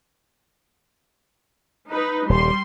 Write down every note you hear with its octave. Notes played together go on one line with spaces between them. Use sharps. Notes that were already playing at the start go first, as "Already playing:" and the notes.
D#4 B4
D#1 G3 C6